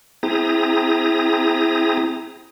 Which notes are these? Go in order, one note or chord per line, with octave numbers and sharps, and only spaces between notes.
C4 E4 G#4 A#5 D#6